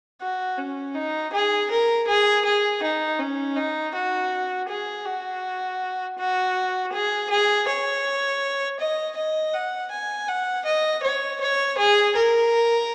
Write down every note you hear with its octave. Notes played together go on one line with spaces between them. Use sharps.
F#4
C#4
D#4
G#4
A#4
G#4
G#4
D#4
C#4
D#4
F#4
G#4
F#4
F#4
G#4
G#4
C#5
D#5
D#5
F#5
G#5
F#5
D#5
C#5
C#5
G#4
A#4